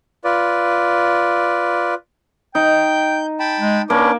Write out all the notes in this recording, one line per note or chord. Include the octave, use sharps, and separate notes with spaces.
F4 B4 D5
D#4 G5 G6
G5 A5 B5
G#3
A#3 C#4 D4 B4 D6